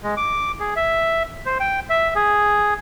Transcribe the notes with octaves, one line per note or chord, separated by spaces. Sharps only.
G#3
D6
G#4
E5
C5
G5
E5
G#4